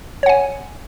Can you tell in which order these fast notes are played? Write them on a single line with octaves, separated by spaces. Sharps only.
C#5 F#5 G#5